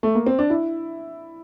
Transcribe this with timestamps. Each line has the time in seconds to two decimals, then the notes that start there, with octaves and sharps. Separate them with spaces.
0.03 A3
0.15 A#3
0.27 C4
0.39 D4
0.50 E4